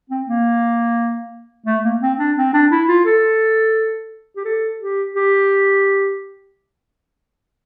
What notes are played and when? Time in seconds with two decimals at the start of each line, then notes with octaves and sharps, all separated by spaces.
0.10 C4
0.28 A#3
1.67 A3
1.84 A#3
2.01 C4
2.19 D4
2.37 C4
2.53 D4
2.71 E4
2.88 F4
3.06 A4
4.36 G4
4.45 A4
4.80 G4
5.15 G4